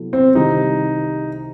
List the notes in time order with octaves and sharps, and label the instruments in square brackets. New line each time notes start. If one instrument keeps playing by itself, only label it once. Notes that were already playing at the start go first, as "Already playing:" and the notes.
Already playing: [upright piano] C3 F#3 B3 E4 A4
[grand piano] C4
[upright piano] C2 C3 D#3 G3 [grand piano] D#4